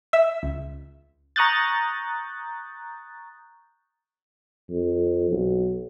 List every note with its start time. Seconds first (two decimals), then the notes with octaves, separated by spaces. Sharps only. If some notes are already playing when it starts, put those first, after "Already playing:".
0.13 E5
0.43 C#2
1.36 A#5 C#6 D#6 F#6 G6 A6
4.70 F2
5.31 B1